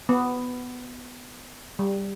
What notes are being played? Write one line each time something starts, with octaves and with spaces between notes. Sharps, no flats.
B3
G3